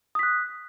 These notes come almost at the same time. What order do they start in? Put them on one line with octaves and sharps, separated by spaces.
D#6 B6 F#6